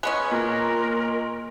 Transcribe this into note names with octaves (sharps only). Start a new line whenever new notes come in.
G#3 B3 C#4 D#5 F#6
A#2 A#4